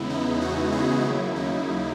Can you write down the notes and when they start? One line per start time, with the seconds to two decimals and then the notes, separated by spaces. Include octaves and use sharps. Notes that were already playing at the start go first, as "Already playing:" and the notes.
Already playing: E2 C#3 G#3 B3 E4
0.10 D#4
0.41 D#4 F#4
0.72 E4 G#4
1.04 D#2 C#3 F#3 A#3 E4
1.36 D#4